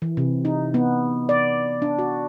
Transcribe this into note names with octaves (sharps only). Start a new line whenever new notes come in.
E3
C3
D#4
B3
D5
D4
F#4